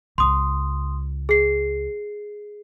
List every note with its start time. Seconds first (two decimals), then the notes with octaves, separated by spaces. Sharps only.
0.18 C#2 C#3 C6 D#6
1.29 G#4 C7